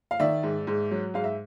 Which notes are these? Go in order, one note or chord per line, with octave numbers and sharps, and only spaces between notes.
F5
D#3 D5 E5
G#2
G#2
F#3
G#2 F5
E5